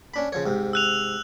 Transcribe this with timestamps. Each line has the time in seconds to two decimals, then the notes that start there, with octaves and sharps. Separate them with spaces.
0.14 C#4 D4 B5
0.32 C#3 F3 C#5
0.46 G#2 C3
0.73 E6 F#6 F7